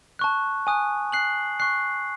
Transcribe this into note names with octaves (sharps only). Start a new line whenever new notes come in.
A5 C#6 F#6
G#5 D#6 F#6
F#6 C7 F#7
C#6 F#6 C7